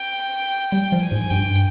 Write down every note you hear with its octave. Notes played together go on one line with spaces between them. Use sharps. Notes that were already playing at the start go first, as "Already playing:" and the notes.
Already playing: G5
G3 G5
F3
G#5
G#2
G2 G5